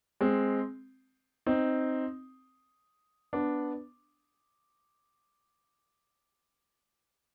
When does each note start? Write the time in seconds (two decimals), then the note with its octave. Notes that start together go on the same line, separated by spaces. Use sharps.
0.21 G#3 C4
1.46 C4 D#4
3.33 B3 D4